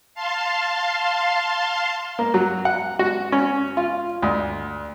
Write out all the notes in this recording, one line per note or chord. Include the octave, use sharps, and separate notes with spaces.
F5 A5 C6
A#3
F#3
F#5
F#4
C#4
F4
D2